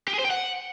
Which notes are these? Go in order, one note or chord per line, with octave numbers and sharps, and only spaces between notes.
G4
G#4
C5
G5
F#5